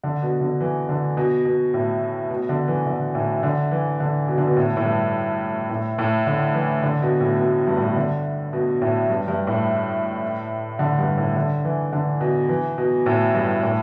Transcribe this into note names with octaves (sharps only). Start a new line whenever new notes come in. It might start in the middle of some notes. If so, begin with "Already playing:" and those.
D3
B2
D3
E3
D3
B2
B2
A2
B2
D3
E3
D3
A2
D3
E3
D3
B2
D3
B2
A2
A2
G2
A2
A2
D3
E3
D3
B2
A2
B2
G2
A2
B2
D3
B2
A2
G2
G2
A2
D3
G2
A2
D3
E3
D3
B2
E3
B2
A2
G2
A2